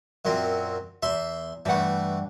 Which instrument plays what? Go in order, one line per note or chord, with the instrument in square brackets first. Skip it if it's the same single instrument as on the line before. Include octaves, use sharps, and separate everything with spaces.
[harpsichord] F#2 A#2 C4
[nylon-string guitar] E2 [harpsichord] E5 C6
[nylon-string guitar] G2 F#5 [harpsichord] E3 A3